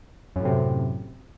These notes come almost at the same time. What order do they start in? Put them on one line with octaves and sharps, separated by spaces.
F#2 A2 C3